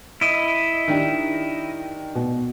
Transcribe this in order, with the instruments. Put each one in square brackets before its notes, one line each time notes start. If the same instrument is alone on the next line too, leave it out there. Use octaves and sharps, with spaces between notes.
[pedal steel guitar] E4 D#5
[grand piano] D#3 D4 G4
B2